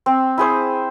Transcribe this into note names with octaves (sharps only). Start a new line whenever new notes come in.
C4
E4 G#4 C5